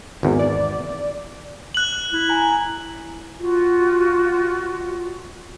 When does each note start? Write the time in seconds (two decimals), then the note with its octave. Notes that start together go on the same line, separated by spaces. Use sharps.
0.23 G#1 E2
0.39 D5
1.75 F#6 F#7
2.13 E4
2.29 G#5 A#5
3.38 F4 F#4